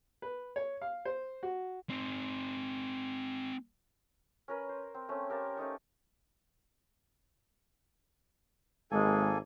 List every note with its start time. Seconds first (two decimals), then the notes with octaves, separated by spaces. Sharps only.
0.22 B4
0.56 C#5
0.82 F5
1.05 C5
1.43 F#4
1.89 C4 D#4
4.48 C#4 A#4 B4
4.69 C5
4.94 C4
5.09 A3 C4 C#4
5.30 G4 A#4 F5 A5
5.57 A3 C#4 D#4 C#6
8.91 G#1 G#3 A#3 A4 G#5